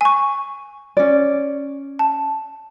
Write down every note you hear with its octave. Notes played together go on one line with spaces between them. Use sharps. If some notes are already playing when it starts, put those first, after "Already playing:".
G#5 C#6
C#4 D5
A5